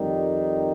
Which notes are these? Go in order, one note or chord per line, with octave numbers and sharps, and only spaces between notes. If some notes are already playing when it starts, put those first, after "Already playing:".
Already playing: F2 D#3 G3